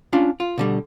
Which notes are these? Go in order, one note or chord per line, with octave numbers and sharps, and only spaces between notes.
C#4 D4 F4
F4
B2 D3 G3